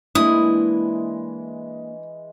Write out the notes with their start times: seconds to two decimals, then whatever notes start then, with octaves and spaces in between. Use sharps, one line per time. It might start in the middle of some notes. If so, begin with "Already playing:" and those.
0.15 E3 G#3 A#3 D4 E4 D#6